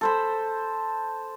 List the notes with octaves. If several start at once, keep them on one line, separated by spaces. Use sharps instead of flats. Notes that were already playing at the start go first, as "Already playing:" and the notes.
A4 C5 B5